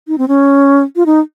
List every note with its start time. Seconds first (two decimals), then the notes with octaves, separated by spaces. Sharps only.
0.08 D#4
0.18 C4
0.28 C#4
0.96 F4
1.06 D#4